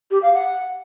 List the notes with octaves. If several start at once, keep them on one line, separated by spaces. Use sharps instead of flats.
G4
F5
F#5